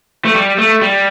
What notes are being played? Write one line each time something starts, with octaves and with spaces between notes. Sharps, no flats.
A3
G3
A3
G3